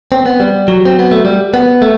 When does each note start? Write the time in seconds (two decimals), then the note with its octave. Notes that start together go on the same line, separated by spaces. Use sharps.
0.12 C4
0.26 B3
0.40 G3
0.68 F#3
0.85 C4
0.99 B3
1.11 A3
1.25 G3
1.54 B3
1.82 A3